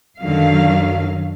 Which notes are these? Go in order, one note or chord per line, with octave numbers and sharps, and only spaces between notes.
F#2 D3 D#3 F#3 F5